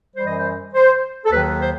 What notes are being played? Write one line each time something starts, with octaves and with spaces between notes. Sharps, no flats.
F#2 E3 G3 C5
D#5
C5
C5
A4
D#2 D#3 F#3 B4
C5